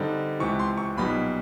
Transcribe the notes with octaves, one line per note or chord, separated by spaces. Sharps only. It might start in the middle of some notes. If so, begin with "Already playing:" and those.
Already playing: G2 D3 G3 C4 D#4
C#2 C3 E3 C#6
C6
C#6
B1 A#2 G3 B3 D#4 B5